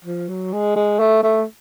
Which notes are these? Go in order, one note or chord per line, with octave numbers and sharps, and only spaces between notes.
F3
F#3
G#3
G#3
A3
A3